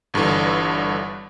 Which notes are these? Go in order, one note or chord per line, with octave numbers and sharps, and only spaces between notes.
G1 G2 D3 E3